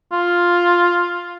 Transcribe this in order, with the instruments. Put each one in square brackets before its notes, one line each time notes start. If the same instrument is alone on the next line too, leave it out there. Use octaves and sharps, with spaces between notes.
[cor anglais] F4